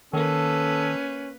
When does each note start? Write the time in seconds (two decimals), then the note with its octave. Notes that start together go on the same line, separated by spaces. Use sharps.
0.13 D#3 A#3 C#4 A4 B4